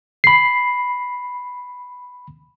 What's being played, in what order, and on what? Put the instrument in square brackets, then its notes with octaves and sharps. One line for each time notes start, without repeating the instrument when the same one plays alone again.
[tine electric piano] B5 C7